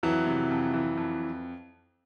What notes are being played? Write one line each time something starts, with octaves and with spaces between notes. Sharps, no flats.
F2 E3 F#3
C3
F2
E3
F2